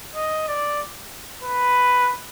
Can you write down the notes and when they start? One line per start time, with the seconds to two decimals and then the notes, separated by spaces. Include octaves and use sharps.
0.15 D#5
0.48 D5
1.43 B4